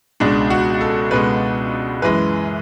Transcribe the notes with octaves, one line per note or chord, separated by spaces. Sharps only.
C#2 B2 G#3 D4
F#4
A4
C#2 B2 G#3 B4
F#2 E3 G#3 B4